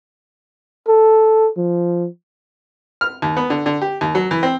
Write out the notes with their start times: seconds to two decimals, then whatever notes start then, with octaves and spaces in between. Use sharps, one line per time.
0.88 A4
1.57 F3
3.01 F6
3.22 D#2
3.37 B3
3.50 D3
3.66 D3
3.82 G4
4.01 D#2
4.15 F#3
4.31 E3
4.43 C4